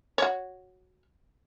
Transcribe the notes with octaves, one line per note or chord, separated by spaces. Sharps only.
F#4 C#5